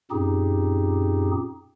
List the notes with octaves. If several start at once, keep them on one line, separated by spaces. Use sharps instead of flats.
F#2 A#2 C4 D#4 G4 G#4